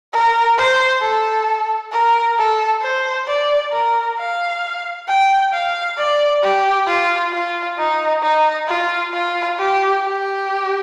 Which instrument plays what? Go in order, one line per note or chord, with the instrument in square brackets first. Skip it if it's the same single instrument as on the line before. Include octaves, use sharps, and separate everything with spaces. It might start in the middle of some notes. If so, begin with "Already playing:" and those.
[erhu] A#4
C5
A4
A#4
A4
C5
D5
A#4
F5
G5
F5
D5
G4
F4
F4
D#4
D#4
F4
F4
G4
G4